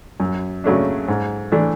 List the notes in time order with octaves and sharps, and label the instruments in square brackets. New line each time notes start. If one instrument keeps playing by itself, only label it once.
[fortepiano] F#2
C#3 F#3 A3 D4
G#2
E3 A3 D4